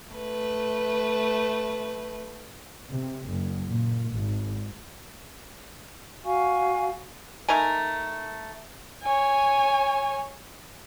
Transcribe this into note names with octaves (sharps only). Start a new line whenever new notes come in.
A3 B4
C3
F#1
A#2
G#1
F#4 F5 G#5 C#6
A3 D#4 A#4 G#5
C#5 G#5